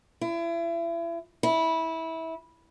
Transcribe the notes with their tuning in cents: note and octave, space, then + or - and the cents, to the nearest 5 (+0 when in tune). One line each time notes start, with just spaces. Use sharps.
E4 +35
E4 -20